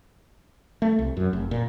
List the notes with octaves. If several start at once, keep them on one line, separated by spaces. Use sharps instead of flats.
A3
C2
F#2
F1
A#2